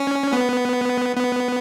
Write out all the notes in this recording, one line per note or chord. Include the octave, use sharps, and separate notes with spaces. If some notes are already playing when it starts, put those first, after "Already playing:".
Already playing: C#4
B3
B3